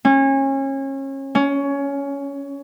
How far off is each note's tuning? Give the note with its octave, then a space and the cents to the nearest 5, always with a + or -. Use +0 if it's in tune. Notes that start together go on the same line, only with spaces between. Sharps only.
C#4 -30
C#4 +15